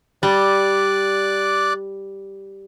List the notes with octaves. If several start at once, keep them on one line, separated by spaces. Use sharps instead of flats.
G3 D5 D6 F#6